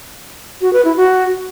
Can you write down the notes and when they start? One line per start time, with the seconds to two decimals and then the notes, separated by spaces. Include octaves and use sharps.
0.61 F#4
0.73 B4
0.85 E4
0.97 F#4